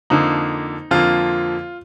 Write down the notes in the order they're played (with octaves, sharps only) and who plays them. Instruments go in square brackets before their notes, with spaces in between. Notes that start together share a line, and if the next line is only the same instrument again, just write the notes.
[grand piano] F2 D3 F3 A#3 D#4
F2 D3 F3 A#3 F4